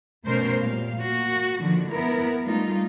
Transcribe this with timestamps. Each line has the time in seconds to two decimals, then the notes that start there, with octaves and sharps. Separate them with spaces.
0.26 B2 A3 C#4 A#4 C5
0.62 A#2 G3 F5
0.99 A#3 F#4
1.60 D3 D#3 F3
1.90 B3 E4 A#4
2.43 G3 A3 D#4 F4